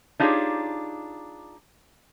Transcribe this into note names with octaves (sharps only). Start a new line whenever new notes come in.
D4 D#4 F4 G4 G#4 C#5